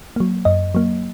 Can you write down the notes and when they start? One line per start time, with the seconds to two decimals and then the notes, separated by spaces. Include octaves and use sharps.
0.16 F#3 A#3
0.45 F#2 D#5
0.75 F#3 A#3